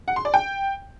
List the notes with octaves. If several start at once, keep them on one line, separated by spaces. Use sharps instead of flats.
F#5
C6
D5
G5